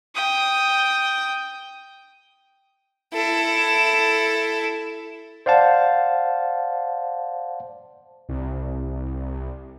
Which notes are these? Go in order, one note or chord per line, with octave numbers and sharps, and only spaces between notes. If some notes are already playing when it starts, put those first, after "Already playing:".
G5 D#6
E4 A4
C5 D5 F5 F#5 A5
C2
C2